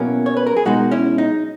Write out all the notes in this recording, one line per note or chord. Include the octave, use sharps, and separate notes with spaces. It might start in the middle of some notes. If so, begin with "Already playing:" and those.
Already playing: B2 F#3 A#3 C#4 E4
C#5
B4
A#4
G#4
B1 B2 G#3 D#4 F#4
C#4 E4
D#4